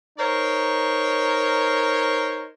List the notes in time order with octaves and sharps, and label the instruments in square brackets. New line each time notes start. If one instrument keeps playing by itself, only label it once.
[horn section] D#4 A#4 C5 C#5